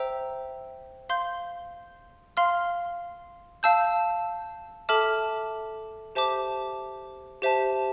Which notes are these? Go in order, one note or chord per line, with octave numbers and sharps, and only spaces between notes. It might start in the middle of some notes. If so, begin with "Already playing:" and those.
Already playing: C5 E5 G5 A#5 E6
F5 C6 G6
F5 C6 F6
F5 A5 E6 G6
A4 E5 A5 D6 F6
G4 C5 E5 A5 D6
G4 C5 E5 A5